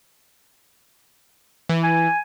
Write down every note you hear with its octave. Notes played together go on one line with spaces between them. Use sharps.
E3
G#5